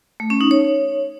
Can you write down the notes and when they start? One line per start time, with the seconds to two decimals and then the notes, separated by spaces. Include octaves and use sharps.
0.20 A3
0.30 C#4
0.41 D#4
0.51 C#5